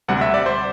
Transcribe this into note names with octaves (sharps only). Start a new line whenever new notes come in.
D2 C3 G3 F#5
E5
D5
C5